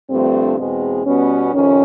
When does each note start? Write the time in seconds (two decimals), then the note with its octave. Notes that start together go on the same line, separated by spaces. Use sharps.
0.10 G2 D3 F3 A3 C4
0.58 E2 B2 G#3 C4
1.05 B2 G3 B3 C#4
1.53 F2 C3 D#3 C#4